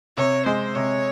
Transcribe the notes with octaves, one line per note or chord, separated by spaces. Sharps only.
C3 C#5
G#3 C5
C3 C#5